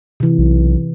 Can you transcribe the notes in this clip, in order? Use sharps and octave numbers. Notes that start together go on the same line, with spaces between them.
C3 E3
B1